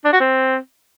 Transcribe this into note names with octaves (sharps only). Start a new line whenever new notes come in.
D4
F#4
C4